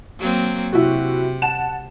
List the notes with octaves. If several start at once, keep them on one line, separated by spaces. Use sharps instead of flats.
F#3 A#3 C4
C3 E4 F#4
F#5 A5 E7